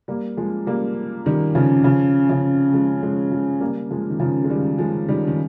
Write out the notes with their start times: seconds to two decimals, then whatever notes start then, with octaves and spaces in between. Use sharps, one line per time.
0.08 G3 A#3
0.37 F3 G#3
0.67 G3 A#3
1.26 D#3 G3
1.55 C#3 F3
1.84 C#3 F3
2.29 C#3 F3
2.73 F3 G#3
3.02 F3 G#3
3.31 F3 G#3
3.61 G3 A#3
3.91 F3 G#3
4.10 D#3
4.20 C#3 F3
4.44 G#3
4.49 D#3 G3
4.78 F3 G#3
5.09 D#3 G3
5.27 D#3